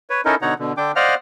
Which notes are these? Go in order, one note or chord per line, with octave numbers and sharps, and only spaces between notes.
B4 C#5
C#4 D#4 E4 A4 A#4 D#5
B2 D3 D#4 C#5 F#5 A#5
B2 D3
D3 D4 G5 D6
C5 D5 D#5 F5 F#5 F6